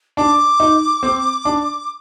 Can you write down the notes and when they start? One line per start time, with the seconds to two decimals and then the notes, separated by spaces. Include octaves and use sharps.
0.17 D4 D6
0.60 D#4
1.03 C4
1.45 D4